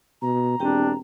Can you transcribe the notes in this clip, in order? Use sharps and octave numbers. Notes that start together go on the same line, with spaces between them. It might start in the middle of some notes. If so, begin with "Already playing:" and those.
B2 A#5
E1 C4 D4 G4 G5